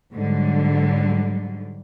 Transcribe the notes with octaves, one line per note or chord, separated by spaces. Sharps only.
G#2 D3 F#3 G3